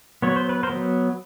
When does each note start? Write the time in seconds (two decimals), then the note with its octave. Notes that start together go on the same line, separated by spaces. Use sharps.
0.22 F#3 B3 C#5
0.36 C5
0.49 B4
0.63 A#4 C5
0.70 F#3 B3